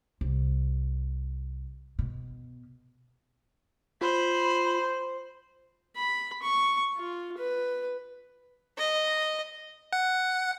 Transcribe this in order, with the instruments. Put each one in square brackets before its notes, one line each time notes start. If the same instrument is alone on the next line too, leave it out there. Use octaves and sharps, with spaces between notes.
[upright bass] C2
B2
[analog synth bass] F4 [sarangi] C5 [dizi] B5
[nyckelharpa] B5
C#6
F4
B4
[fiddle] D#5
[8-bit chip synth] F#5